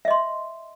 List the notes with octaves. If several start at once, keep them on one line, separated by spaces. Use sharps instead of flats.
D#5 E5 C6